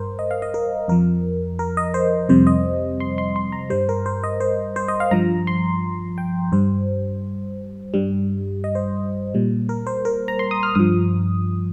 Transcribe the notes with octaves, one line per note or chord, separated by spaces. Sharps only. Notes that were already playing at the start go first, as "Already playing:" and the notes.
Already playing: G2 A#4 C5
D#5
F5
D#5
A#4
F2 F3 A#4
A#4
D#5
C5
F2 C3 G3 C5
D#5
C6
C6
C6
A#5
G2 G3 C5
A#4
C5
D#5
C5
C5
D#5
F5
G2 F3 A#5
C6
G5
G2 G3 C5
G2 G3
D#5
C5
A#2 G3
A#4
C5
A#4
A#5
C6
D#6
F6
G2 F3 D#6